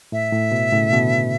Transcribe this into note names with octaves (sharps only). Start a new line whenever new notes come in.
A2 E5
A2
B2
A2 C#3
B2 D3